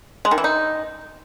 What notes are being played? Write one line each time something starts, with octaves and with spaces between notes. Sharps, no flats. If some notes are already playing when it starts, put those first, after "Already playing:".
G#3
D#3
E3
D#4